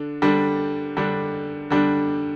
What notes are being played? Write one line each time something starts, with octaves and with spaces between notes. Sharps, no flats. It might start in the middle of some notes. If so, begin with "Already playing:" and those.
Already playing: D3 D4
D3 G3 D4
D3 G3 D4
D3 G3 D4